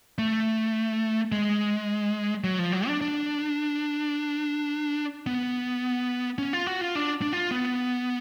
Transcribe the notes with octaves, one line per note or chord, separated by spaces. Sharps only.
A3
G#3
F#3
F3
F#3
D4
D4
B3
C#4
F4
F#4
F4
D4
D4
F4
B3